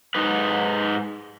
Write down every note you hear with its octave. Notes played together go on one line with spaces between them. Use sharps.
G#2 D#4 B4